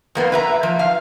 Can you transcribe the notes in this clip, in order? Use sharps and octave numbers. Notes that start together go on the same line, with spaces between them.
F2 A#3 B3
B4 E5 A#5
F3
F5